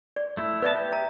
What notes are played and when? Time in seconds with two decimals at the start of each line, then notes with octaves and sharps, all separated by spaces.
0.16 D5
0.37 A3 E4
0.62 B3 B4 D5 E5 A5
0.74 G4
0.92 E5 A#5